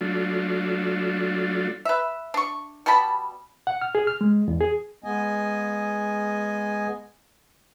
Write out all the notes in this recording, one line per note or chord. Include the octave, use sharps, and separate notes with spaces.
F#3 A3 D4 F4
B4 E5
D4 C#6
B2 G3 A5 B5
F#5
F6
G#4
F6
G#3
E2
G#4
G#3 B3 D#5 G#5